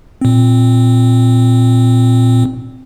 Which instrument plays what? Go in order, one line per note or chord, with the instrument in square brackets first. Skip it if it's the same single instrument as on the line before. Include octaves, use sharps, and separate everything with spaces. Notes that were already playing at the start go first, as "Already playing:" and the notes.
[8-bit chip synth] A#2 C4